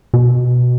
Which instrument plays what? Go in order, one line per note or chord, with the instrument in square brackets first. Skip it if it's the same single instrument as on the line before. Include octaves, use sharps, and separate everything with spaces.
[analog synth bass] B2